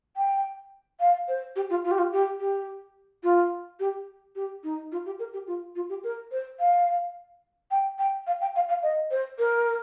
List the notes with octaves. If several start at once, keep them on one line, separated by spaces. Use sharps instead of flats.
G5
F5
C5
G4
F4
F4
G4
F4
G4
G4
F4
G4
G4
D#4
F4
G4
A#4
G4
F4
F4
G4
A#4
C5
F5
G5
G5
F5
G5
F5
F5
D#5
C5
A#4